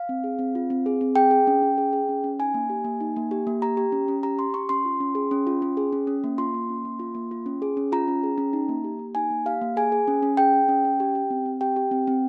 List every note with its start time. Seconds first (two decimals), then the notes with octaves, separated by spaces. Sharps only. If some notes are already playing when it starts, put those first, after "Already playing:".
Already playing: F5
0.09 C4
0.24 G#4
0.39 C4
0.55 F4
0.70 C4
0.86 G#4
1.01 C4
1.15 G#4 G5
1.31 G#4
1.47 C#4
1.62 C#4
1.78 G#4
1.93 G#4
2.09 C#4
2.24 C#4
2.39 D#4 G#5
2.54 A#3
2.70 G4
2.84 A#3
3.01 D#4
3.16 A#3
3.31 G4
3.47 A#3
3.62 G4 A#5
3.77 G4
3.92 C#4
4.08 C#4
4.23 G4 A#5
4.38 G4 C6
4.54 C#4 C#6
4.69 C#4 C6
4.85 F4
5.00 C#4
5.15 G#4
5.31 C#4
5.47 F4
5.62 C#4
5.77 G#4
5.92 C#4
6.07 C#4
6.24 A#3
6.38 F4 C6
6.54 A#3
6.69 C#4
6.85 A#3
6.99 F4
7.15 A#3
7.31 F4
7.46 C#4
7.62 G#4
7.77 C#4
7.92 F4 A#5
8.08 C#4
8.23 G#4
8.38 C#4
8.53 D#4
8.69 A#3
8.84 G4
8.99 A#3
9.15 D#4 G#5
9.31 A#3
9.45 G4 F5
9.61 A#3
9.77 G#4 G#5
9.92 G#4
10.07 C#4
10.23 C#4
10.37 G#4 G5
10.53 G#4
10.68 C#4
10.85 C#4
11.00 G4
11.15 G4
11.30 C4
11.46 C4
11.61 G4 G5
11.76 G4
11.91 C4
12.07 C4